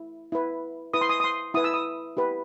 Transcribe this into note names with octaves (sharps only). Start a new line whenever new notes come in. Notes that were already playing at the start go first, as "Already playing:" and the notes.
Already playing: E4
E4 B4
E4 B4 D#6
C6
D#6
D#6
C6
E4 B4 D#6
E6
D#6
E4 G4 B4